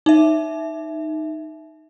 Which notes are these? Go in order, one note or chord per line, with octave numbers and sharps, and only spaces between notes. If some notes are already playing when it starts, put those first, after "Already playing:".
D#4 E5